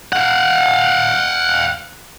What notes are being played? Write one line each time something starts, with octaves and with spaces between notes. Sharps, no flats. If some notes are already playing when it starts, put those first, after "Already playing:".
F5 F#5